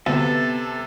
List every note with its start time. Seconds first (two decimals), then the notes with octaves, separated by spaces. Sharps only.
0.06 D2 C3 B3 A4